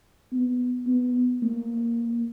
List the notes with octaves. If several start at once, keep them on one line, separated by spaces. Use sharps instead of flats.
B3
B3
A#3